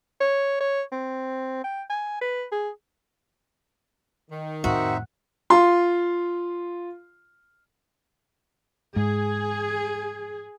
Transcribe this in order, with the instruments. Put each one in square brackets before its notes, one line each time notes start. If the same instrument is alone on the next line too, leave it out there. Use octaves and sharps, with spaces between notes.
[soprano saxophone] C#5
C#5
C4
G5
G#5
B4
G#4
[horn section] D#3
[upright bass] F2 A2 [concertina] C4 D#4 E5 [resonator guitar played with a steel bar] F#4
[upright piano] F4 C6
[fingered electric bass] G#2 [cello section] G#4